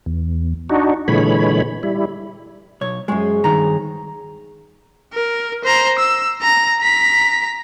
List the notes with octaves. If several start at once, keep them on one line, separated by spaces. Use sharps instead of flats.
E2
D4 D#4 F#4
A#2 D3 E3 G#3 C#5 B5
G3 E4
B1 C#5
F#2 G#3 G#4 C5 C#5
G2 D#3 A#5
A#4
C5 A#5
E6
A#5
A#5 B6